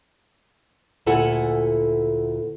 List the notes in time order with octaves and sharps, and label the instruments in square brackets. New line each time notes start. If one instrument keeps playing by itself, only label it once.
[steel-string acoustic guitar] D2 A#2 E4 A4 F#5 G#5